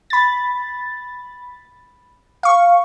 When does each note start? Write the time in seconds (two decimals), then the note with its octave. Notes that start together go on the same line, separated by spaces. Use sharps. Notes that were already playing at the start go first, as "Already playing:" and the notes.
0.10 B5 A6
2.43 F5 C#6